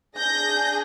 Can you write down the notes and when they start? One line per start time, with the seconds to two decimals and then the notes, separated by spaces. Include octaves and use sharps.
0.17 D4 G#4 G6 A#6